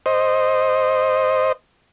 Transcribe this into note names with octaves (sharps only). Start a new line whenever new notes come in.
C5 D#5